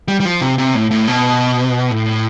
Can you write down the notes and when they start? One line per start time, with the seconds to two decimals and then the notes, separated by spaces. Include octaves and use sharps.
0.08 G3
0.20 G3
0.25 F3
0.41 C3
0.58 C3
0.75 A2
0.91 A2
1.08 B2
1.91 A2